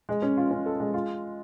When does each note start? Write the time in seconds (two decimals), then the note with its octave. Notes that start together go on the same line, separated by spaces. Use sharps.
0.09 G#3
0.22 C#4
0.37 F4
0.51 C#4
0.66 A4
0.80 G#3
0.94 F4